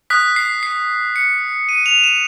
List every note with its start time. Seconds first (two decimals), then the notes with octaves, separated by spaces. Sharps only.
0.10 D#6 F#6 B6
0.36 C7
0.63 C7
1.16 C#7
1.69 D#7
1.86 F7
2.04 E7